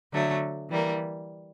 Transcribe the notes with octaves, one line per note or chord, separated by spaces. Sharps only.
D3 F#3 A3
E3 G3 A#3